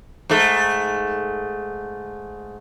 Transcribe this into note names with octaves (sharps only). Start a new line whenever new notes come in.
G#2 A3